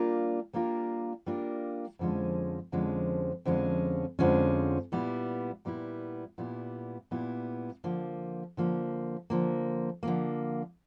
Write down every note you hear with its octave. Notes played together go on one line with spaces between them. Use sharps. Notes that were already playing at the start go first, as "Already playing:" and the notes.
Already playing: G3 A#3 D4 F4 A#4
G3 A#3 D4 F4 A#4
G3 A#3 D4 F4 A#4
F2 D3 F3 G#3 C#4
F2 D3 F3 G#3 C#4
F2 D3 F3 G#3 C#4
F2 D3 F3 G#3 C#4
A#2 G3 B3 E4
A#2 G3 B3 E4
A#2 G3 B3 E4
A#2 G3 B3 E4
D3 F3 A#3
D3 F3 A#3
D3 F3 A#3
D3 F3 A#3